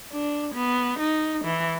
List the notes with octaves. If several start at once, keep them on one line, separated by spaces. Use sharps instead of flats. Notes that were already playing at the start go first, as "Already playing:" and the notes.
D4
B3
D#4
E3